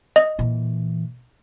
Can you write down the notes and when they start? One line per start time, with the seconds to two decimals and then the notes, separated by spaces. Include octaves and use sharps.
0.16 D#5
0.39 A#2 E3